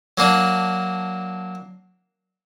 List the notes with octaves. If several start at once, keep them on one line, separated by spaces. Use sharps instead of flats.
F#3 A#3 D4